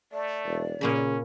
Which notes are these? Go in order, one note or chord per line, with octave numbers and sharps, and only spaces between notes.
A3 D5
E1
A#2 C#3 A#3 C#4 B5